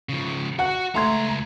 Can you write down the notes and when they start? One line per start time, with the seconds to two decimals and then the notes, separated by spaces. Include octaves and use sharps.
0.09 C#3 F3
0.59 F#4 F#5 F#6
0.95 C#2 A3 A#5 C6 G#6